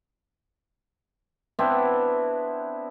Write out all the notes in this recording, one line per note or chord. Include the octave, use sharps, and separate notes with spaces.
B3 C4 D4 E4